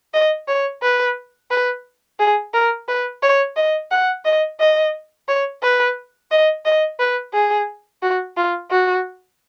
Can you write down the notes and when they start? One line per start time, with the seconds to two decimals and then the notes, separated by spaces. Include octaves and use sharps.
0.14 D#5
0.48 C#5
0.82 B4
1.51 B4
2.19 G#4
2.54 A#4
2.88 B4
3.23 C#5
3.56 D#5
3.91 F#5
4.25 D#5
4.60 D#5
5.28 C#5
5.62 B4
6.31 D#5
6.65 D#5
6.99 B4
7.33 G#4
8.02 F#4
8.36 F4
8.71 F#4